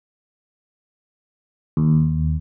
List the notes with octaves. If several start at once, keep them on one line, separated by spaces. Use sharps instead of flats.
D#2